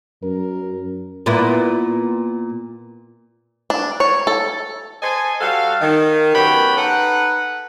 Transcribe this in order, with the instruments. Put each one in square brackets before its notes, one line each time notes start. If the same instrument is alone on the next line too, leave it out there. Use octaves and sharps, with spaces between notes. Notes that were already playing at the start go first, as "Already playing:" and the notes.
[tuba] F#2 [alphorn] A#4
[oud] A#2 B3 E4
[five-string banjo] D4
C#5
A4
[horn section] A4 C5 D#5 G#5
G3 F#4 A4 F5
D#3
F#2 B3 G4 C#5 G5 B5
D#4 A4 B4 F#5